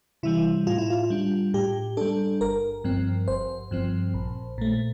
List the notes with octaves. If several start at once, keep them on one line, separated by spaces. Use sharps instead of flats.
C3 E3 G3 E4
A2 F4
E4
F4
G3 D4
A2 G4
G3 D4 A4
G1 A#4
G2 F3 C4
G1 C5
G2 F3 C4
A#1
A#2 A3